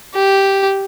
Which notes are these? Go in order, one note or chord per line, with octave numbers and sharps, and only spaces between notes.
G4